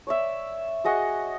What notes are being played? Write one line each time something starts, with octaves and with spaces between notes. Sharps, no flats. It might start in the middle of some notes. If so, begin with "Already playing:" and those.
C#5 D5 E5
F#4 G#4 D#5 F#5